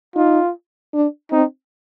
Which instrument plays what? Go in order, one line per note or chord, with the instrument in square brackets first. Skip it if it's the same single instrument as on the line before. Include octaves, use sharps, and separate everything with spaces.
[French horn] D#4 [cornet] F4
[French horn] D4
[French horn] C4 [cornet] D#4